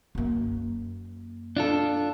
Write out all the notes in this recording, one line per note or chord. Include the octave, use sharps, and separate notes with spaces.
F#2 A#3
D4 F4 A4